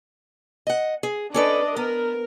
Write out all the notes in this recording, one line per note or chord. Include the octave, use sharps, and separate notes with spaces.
D#5 F#5
G#4
C#4 D4 A4 B4 D5 D#5
B3 A#4